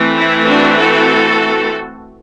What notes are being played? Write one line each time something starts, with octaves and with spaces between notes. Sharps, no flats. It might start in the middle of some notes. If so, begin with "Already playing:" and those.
Already playing: E3 A3 C4
E4
D4 F#4
F#4 A4